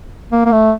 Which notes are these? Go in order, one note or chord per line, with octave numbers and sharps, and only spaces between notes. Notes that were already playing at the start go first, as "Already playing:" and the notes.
A#3
A#3
A3